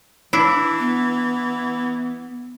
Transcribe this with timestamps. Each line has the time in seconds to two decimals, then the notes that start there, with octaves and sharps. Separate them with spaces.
0.33 E3 D4 E4
0.79 B3